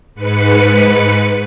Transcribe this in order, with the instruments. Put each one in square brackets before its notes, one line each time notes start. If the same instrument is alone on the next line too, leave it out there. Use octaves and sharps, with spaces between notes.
[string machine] G#2 B4 C#7